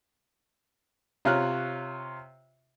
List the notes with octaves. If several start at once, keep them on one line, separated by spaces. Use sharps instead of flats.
C3 F4 C#5 A#5 F6 F#6